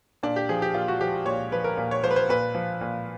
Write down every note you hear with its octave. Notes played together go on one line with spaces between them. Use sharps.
A#2 D4
G4
F3 G#4
G4
A#2 F4
F#4
F3 G4
A#2 C#5
F3 B4
A#4
A#2
C#5
F3 C5
B4
C5
A#2 B4
F3
A#2